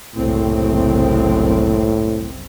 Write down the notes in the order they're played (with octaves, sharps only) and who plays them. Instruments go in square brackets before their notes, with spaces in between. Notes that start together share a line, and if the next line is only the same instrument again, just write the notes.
[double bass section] F#1 C2 C4 [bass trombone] A2